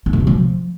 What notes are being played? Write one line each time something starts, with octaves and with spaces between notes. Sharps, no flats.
E4
D3
C3
F3